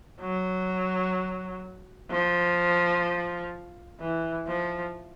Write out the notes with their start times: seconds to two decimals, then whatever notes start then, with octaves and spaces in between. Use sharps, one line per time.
0.21 F#3
2.10 F3
4.00 E3
4.47 F3